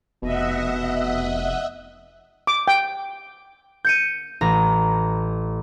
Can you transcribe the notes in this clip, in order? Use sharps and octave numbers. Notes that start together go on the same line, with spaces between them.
F1 B2 D#5 E5 F#5
D6
G5
G6 C#7 D#7
A1 A#5